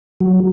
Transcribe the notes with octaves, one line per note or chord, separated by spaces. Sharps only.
F#3